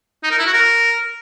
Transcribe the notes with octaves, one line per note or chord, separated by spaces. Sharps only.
D#4
A#4
E4
F#4
A#4